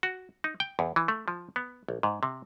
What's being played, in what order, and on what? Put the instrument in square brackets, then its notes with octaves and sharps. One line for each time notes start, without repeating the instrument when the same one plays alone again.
[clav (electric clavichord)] F#4
D#4
G5
E2
E3
A3
F3
B3
A#1
G#2
C3